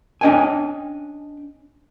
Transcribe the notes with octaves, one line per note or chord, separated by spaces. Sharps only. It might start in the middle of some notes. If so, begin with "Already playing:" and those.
C#4 D4 D#5 G5 G#5